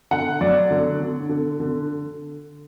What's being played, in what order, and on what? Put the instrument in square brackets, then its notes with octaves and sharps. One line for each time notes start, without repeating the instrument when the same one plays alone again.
[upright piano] D3 F#5
F#3 D5
D3
D3
D3
D3